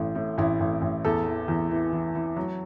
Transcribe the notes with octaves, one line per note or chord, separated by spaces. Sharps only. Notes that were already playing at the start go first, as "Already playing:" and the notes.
Already playing: A1 A2
A2
A1 E4
A1
A1
E2 A4
E3
E2
E3
E3
E3
F#3